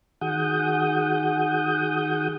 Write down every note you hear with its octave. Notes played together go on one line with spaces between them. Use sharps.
D#3 F#4 G#4 F#5 D#6 G6